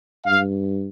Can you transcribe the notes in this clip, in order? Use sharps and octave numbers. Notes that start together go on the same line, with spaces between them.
G2 F5